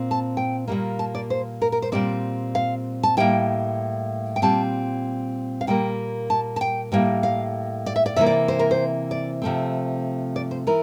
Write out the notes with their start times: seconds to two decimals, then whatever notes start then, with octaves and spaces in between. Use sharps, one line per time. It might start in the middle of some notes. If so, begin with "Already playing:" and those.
Already playing: A#2 C4
0.11 A5
0.37 G5
0.68 A#2 G3 A#3
0.99 A5
1.15 D5
1.30 C5
1.62 A#4
1.72 A#4
1.82 C5
1.92 A#2 G3 C4 D5
2.55 F5
3.03 A5
3.17 A2 G3 A#3 G5
4.36 G5
4.42 A#2 G3 C4 A5
5.61 F5
5.67 A#2 G3 A#3 G5
6.30 A5
6.56 A5
6.61 G5
6.92 A2 G3 A#3
7.23 F5
7.86 D5
7.96 E5
8.06 D5
8.16 C3 E3 A#3 E5
8.26 D5
8.48 C5
8.59 A#4
8.71 C5
9.11 D5
9.42 C3 F3 A3 C4
10.36 D5
10.51 C5
10.67 E3 A#4